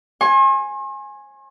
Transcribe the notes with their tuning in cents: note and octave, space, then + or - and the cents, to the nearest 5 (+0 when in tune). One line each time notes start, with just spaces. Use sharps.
G#5 +0 C6 +45